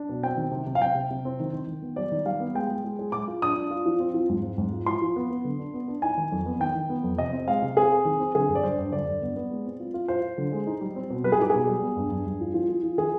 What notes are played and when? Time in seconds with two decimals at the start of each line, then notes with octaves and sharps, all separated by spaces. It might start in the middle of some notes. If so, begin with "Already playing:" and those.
Already playing: D4
0.09 B2
0.23 C4 G5
0.37 D#3
0.51 C3
0.67 C3
0.75 F5
0.81 C3 G5
0.95 C3
1.10 C3
1.25 C4
1.40 D#3
1.53 D#3
1.67 D#3
1.82 B3
1.96 G3 D5
2.12 D#3
2.25 G3 F5
2.40 B3
2.55 G#3 G5
2.69 G#3
2.84 G#3
2.99 G#3
3.12 G#3 D6
3.28 F4
3.42 D4 D#6
3.56 D4
3.71 F4
3.86 F3
3.99 C4
4.14 F3
4.29 G#2
4.43 C4
4.58 G#2
4.73 F4
4.86 F3 C6
5.02 F3
5.16 B3
5.30 B3
5.45 D3
5.59 D4
5.74 B3
5.88 D4
6.02 D#4 G#5
6.17 D#3
6.32 F2
6.46 B3
6.60 D#3 G5
6.75 D#3
6.89 B3
7.03 F2
7.18 C3 D#5
7.33 C4
7.47 G#3 F5
7.62 C3
7.76 C4 G#4
7.92 C4
8.05 D#3
8.20 C4
8.35 D3 G#4
8.49 G2
8.55 D5
8.63 G2 C5
8.78 G2
8.92 D3 D5
9.06 G2
9.22 B3
9.36 B3
9.51 G#3
9.65 C4
9.80 F4
9.94 F4
10.08 F4 C5
10.22 F4
10.38 D3
10.52 G#3
10.67 D#4
10.81 G3
10.96 C4
11.10 B2
11.24 G3 B4
11.32 G#4
11.39 D#4 G4
11.50 B2 G#4
11.68 G3
11.82 B3
11.96 G2
12.11 G2
12.26 G2
12.41 F3
12.54 F3
12.69 F3
12.83 F3
12.98 D#3 G#4